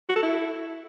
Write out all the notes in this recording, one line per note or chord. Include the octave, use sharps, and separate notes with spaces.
F#4
A4
E4